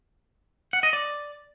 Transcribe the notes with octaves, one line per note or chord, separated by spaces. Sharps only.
F#5
D#5
D5